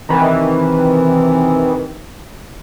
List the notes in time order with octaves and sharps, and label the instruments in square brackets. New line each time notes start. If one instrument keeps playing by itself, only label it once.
[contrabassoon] C3 [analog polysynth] D#3 E3